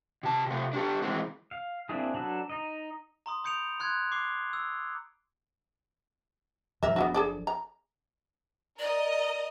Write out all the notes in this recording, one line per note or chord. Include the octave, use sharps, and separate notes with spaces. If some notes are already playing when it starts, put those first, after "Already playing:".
C3 A5
C3 A3
D4 G4 A4
E3 G#3 C4
F5
A#3 C4 D4 E4 G#4
F#3 D4 A4 B4
D#4 D#5
A#5 C6 D#6
B5 D#6 G6 C#7 D7 F7
C6 F#6 G#6
D6 C7 G7
E6
G2 F3 A#4 E5
F#1 F3 B3 D4 E4 F#4
G#4 A4 D5
A#5
A#4 D5 D#5